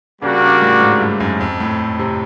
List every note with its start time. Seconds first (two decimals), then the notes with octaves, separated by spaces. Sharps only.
0.22 C#3 G3 A#3 D4 F#4 A#4
0.41 C#3
0.62 A2
0.81 G#2
1.00 G2
1.20 F#2
1.41 F2
1.60 A2
1.99 C3